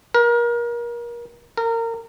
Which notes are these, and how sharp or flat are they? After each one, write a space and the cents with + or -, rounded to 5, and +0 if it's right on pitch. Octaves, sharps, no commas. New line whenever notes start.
A#4 +30
A#4 -25